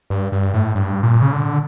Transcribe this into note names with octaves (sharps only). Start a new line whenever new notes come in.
G2
G2
A2
G2
A#2
C#3
D3